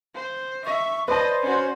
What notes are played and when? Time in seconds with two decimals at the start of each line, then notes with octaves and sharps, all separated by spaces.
0.14 C5
0.65 E5 C#6
1.08 B4 C5 D5 D#5 A5 C6
1.43 C#4 F#4